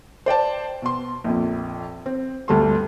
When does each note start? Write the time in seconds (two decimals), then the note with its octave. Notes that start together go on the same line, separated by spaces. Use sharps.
0.26 C5 D5 G5 A5
0.82 B2 C6
1.24 A#1 F2
2.06 C4
2.48 G1 D2 G3 A4 C6